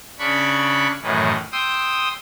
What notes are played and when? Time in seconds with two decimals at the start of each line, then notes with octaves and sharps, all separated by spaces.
0.19 C#3 D4 B5 C#6
1.02 F#2 A2 D#3 E3
1.52 G5 C6 D#6 E6